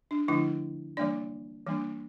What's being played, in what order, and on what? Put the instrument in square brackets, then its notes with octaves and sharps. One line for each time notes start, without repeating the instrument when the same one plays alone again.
[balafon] D4
D3 F3 A3 D4 E4
E3 G3 A#3 D4 D5
E3 G3 A#3 D4